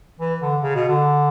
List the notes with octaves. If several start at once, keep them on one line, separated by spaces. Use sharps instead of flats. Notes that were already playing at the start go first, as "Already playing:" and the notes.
E3
D3
C#3
B2
D3